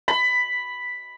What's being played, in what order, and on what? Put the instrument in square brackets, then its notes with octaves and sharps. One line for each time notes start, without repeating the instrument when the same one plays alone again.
[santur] B5